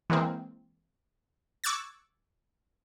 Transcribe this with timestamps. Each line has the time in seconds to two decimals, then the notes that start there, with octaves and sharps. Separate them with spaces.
0.10 E3 G#3 A#3 C4
1.64 C#6 D6 E6 F#6 G#6 A6